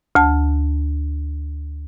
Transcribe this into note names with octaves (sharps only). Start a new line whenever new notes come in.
D2 A5